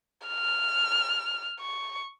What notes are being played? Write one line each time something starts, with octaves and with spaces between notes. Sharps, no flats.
F6
C#6